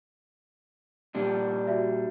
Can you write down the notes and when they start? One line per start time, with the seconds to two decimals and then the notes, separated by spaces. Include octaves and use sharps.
1.15 A#2 G3 D4
1.68 F#4 D5 E5